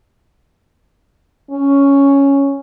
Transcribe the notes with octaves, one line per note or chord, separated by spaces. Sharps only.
C#4